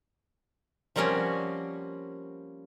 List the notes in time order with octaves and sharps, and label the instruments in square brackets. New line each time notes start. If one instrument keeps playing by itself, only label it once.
[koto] F3 G3 A#3 C4 C#4 F#4